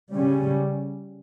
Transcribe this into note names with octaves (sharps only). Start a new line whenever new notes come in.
C#3 G3 C#4